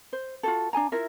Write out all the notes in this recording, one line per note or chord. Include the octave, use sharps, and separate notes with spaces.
C5
F4 F#4 A4
D4 A4 G#5 A#5
E4 F4 A#4 E5